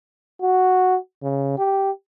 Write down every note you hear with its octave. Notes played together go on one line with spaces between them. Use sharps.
F#4
C#3
G4